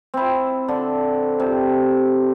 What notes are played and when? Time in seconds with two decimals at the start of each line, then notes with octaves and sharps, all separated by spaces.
0.14 C4 E4
0.68 D3
1.40 C3